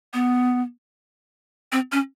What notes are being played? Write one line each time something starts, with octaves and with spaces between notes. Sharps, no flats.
B3
C4
C#4